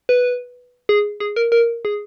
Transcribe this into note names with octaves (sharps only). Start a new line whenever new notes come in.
B4
G#4
G#4
A#4
A#4
G#4